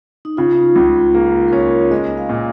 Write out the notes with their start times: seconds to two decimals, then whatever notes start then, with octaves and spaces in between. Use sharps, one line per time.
0.25 D#4
0.37 C#3 F4
0.76 C#2
1.14 A#3 G#4
1.48 A#4
1.52 C#4 C#5
1.91 G#3 D#5
2.18 F5
2.29 A#2